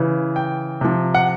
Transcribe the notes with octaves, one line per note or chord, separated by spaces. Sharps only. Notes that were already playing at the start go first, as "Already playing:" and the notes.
Already playing: C#3 E3
G5
C3 F3
F#5